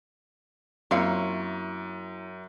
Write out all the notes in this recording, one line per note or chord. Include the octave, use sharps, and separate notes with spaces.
F#2 A#3 C4 E4 F4 C#5 F5